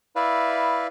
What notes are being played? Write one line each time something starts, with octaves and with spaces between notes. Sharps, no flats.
E4 B4 D5 E5 F5